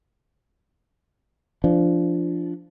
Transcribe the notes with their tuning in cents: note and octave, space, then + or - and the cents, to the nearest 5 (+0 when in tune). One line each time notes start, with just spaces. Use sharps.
F3 -20 D4 -5